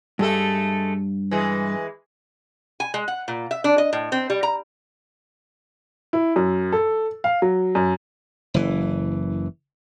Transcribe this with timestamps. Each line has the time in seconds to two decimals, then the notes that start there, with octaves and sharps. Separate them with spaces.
0.19 G2 G#3 A3 A4
1.31 E3 G#3
2.80 G#5
2.94 G#3
3.08 F#5
3.28 A#2
3.51 E5
3.64 D4
3.78 D#5
3.93 A2
4.12 C4
4.30 G3
4.43 A#5
6.13 E4
6.36 F#2
6.72 A4
7.24 F5
7.42 F#3
7.75 F#2
8.54 F#1 E3